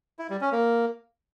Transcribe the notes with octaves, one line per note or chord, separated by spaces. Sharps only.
E4
G3
C#4
A#3